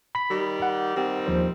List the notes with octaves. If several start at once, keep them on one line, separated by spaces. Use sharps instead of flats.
B5 B6
D#3 G3 G4
F#5
D#3 G3 C4
D#2 F3 C5